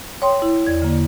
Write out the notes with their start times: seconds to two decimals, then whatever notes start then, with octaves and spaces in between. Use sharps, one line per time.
0.22 C#5 G5 C6 D#6
0.42 E4
0.66 E2 D5 G#6
0.82 D3 A#3